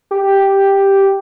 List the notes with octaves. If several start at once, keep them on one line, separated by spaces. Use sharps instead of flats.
G4